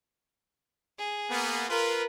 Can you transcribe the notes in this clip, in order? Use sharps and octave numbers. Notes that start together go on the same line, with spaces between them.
G#4
A#3 B3
F4 A#4 B4